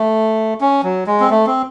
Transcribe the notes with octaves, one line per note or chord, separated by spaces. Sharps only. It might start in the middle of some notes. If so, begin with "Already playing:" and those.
Already playing: A3
C#4
F#3
G#3
C4
A3
C4